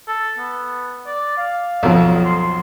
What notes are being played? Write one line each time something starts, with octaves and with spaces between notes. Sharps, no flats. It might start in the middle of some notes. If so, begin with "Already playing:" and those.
A4
B3
D5
F5
B1 F2
C6